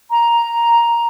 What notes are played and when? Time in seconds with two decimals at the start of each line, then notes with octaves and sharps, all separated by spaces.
0.10 A#5